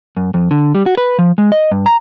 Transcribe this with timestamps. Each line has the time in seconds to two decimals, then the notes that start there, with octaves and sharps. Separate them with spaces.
0.17 F#2
0.34 F2
0.51 D3
0.75 G3
0.86 F#4
0.97 B4
1.19 F3
1.38 G#3
1.52 D#5
1.71 G2
1.86 A#5